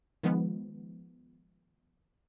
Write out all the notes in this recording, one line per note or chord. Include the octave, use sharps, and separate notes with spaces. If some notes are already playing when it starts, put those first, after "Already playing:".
D#3 F3 G#3 B3